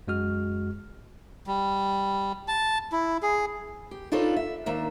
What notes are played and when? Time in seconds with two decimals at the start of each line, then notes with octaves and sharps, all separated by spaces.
0.08 F#2 G#3 F#4 F6
1.47 G3
2.48 A5
2.92 E4
3.23 G#4
3.91 G4
4.12 D4 D#4 F4 A4 B4 C#5
4.37 E5
4.66 D#2 A#3 D4 E5